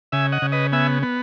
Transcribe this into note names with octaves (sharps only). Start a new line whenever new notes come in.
C#3 E5 G#5
D#5 F#5
C#3
B4 D#5
B3 E5 G#5
B3